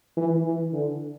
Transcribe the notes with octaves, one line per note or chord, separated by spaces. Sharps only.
E3
E3
D3